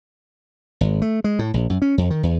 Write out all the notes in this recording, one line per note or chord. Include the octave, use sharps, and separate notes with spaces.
G#1
A3
G#3
A2
A#1
F#2
C#4
F2
D#3
E2